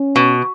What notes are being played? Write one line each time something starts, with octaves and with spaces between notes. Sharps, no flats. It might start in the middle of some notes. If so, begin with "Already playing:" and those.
Already playing: C#4
B2